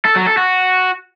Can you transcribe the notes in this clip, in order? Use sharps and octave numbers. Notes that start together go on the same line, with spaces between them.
A4
F#3
A4
F#4